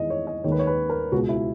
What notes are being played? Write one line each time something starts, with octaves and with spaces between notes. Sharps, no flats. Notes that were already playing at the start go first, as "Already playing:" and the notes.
Already playing: E2 D#3 G#3 D#5
C#5
D#5
D#2 D#3 G#3 C#5
B4
C#5
B4
A#4
C#2 B2 G#3 F#4
E4